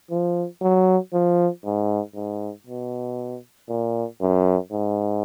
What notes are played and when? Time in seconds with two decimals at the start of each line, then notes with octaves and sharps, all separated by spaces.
0.10 F3
0.62 F#3
1.13 F3
1.65 G#2
2.15 G#2
2.67 B2
3.69 A#2
4.21 F#2
4.72 G#2